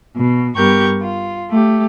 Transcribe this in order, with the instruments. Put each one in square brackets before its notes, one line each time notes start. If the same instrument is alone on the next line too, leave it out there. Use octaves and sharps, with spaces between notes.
[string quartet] B2
G2 B3 G4 A#4 C#6 G6
F4
A3 G4